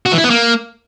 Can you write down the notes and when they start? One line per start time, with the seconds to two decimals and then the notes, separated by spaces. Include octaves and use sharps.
0.06 F#4
0.12 E3
0.18 E4
0.24 B3
0.30 A#3